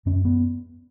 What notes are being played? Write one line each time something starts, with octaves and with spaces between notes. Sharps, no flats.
F#2 C#4
B3